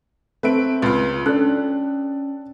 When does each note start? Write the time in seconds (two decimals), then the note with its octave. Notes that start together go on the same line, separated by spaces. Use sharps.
0.43 A3 C4 B4 E5 D7
0.82 C#2 F4
1.26 C#4 D4 A4 F#6